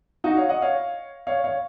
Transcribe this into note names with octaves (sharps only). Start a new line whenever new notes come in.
D#4 F#4
C#5 F5
D#5 F#5
C#5 F5
C#5 F5
C#5 F5